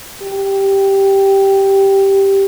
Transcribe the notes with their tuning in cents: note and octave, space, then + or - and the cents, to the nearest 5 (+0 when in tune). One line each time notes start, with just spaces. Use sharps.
G4 -5